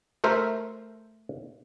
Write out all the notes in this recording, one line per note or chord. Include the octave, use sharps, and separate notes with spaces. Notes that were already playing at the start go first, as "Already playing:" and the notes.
A3 A#4 C5 E5